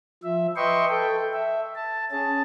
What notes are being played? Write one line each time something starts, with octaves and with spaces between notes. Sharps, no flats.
F3 E5
B4 D#5 E5 G5 C6 C#6
A4 G5
E5
A5
C#4 G#4 A5